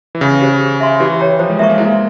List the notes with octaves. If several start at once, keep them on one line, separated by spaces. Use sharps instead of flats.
E3
C#3 C#4
G4 C5
G#4
E5 G#5 C6
E3 G4
C#5 G5 A#5
F3 C5
G#3
A#3 E5 A#5 C#6
A#3
G#3 E4
A#3